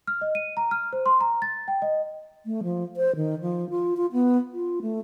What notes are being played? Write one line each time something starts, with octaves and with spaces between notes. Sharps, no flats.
F6
D#5
D#7
A#5
F6
C5
C6
A#5
A6
G5
D#5
A3
F3
C5
D#3
F3
F4
F4
B3
F4
A3